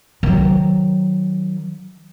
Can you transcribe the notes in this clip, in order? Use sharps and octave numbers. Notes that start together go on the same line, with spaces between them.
D#3 F#3